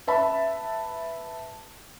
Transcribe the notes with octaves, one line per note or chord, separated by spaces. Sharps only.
B4 E5 A5 B5